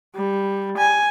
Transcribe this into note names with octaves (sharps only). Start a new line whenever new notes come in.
G3
G#5